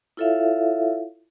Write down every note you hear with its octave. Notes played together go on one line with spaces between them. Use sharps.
E4 F4 A4 C#5 E5 F5